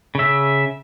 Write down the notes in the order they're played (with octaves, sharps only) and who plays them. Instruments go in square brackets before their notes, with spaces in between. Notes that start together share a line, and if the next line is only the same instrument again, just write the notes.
[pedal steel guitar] C#3 E5